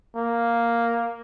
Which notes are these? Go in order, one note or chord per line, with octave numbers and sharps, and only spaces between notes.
A#3